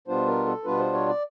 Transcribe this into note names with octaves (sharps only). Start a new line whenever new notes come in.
B2 G3 B3 D4 F4 C5
A#4
A4
B2 G3 B3 D4 F4 B4
C5
C#5
D5